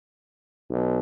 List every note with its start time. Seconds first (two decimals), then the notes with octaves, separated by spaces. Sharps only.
0.70 B1